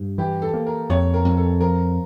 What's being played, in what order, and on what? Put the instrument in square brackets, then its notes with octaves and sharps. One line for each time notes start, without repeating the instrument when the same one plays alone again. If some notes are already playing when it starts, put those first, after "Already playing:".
Already playing: [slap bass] G2
[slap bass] E3 [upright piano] G4
[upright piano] A4
[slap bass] A#3
[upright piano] A#4
[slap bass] F2 [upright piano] C#5
[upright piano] A#4
[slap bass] F2
[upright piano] A4
[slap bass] F3 [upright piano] A#4